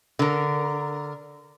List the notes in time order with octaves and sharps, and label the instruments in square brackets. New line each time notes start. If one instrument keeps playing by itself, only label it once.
[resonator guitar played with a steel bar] D3 A#4